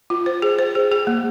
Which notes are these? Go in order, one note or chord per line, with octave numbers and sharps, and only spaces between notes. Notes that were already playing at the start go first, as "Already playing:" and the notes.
F4
C5
G#4
C5
G#4
G#4
A#3